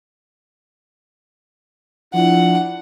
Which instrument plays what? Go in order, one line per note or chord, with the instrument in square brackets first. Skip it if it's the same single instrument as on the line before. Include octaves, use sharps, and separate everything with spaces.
[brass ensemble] F3 D4 E4 [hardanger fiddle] F#5